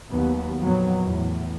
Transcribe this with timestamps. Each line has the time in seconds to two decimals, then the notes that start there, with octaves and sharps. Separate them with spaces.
0.11 D#2 F#3 B3
0.60 F2 A#2 D#3 F#3 B3
1.05 E2 A2